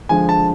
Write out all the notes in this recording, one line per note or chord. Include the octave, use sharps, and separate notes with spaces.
D3 F3 G#3 G#5
A5